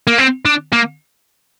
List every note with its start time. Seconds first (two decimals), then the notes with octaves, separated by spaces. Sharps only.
0.07 A#3
0.18 C4
0.45 D4
0.73 A#3